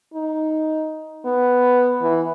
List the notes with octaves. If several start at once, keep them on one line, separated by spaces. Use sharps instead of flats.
D#4
B3
E3